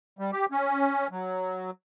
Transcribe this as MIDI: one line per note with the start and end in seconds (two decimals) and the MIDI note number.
0.19 0.31 55
0.32 0.46 67
0.52 1.07 61
1.11 1.71 54